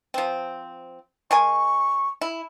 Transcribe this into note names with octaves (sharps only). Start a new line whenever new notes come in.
F3 C4
G#3 A#4 G#5 C#6
E4